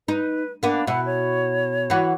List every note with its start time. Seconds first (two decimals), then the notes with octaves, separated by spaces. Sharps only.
0.08 D#4 B4
0.63 A#3 B3 D4
0.87 B2 E4 F#5
1.06 C#5
1.90 E3 F#4